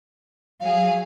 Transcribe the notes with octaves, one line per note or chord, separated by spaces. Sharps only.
F#3 G#4 F5